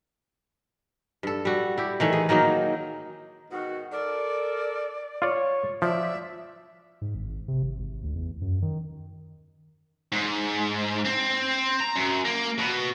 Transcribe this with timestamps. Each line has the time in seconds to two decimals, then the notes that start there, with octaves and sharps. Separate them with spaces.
1.23 G2 A4
1.45 G3 F#4
1.78 E4 G4
2.00 D#3 E3 A3 C#5
2.13 G#4
2.29 D#3 F#3 A#3 D#4
3.51 G#2 B2 D#3 F#4
3.92 A4 A#4 D5
5.22 F4 C#5 D5
5.82 F3 F#4 D5 E5
7.01 G#2
7.15 G#1
7.48 C3
7.63 G#1
7.79 G#1
8.04 D2
8.16 E2
8.42 F#2
8.62 D#3
10.12 G#2
11.05 C4
11.80 A#5
11.96 F#2
12.25 A#3
12.59 B2